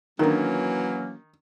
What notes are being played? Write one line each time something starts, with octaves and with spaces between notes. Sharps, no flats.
D#3 E3 F#3 A#3 C#4 D4 A#4